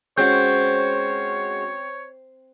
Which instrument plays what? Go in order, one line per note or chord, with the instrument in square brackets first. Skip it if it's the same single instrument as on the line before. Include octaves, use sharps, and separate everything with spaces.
[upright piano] G#3 C#4 F#4 [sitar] C4 [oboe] C#5 [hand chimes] G6